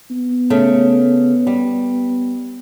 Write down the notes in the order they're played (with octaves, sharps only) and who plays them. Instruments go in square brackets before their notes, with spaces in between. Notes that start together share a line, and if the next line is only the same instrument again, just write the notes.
[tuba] B3
[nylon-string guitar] C#3 A3
G3